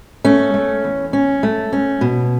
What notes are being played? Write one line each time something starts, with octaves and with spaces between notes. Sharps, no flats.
A3 C#4
A3
E2
C#4
A3
C#4
B2